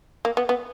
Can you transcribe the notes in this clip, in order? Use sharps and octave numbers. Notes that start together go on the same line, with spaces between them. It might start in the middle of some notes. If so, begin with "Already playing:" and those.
A#3
B3
B3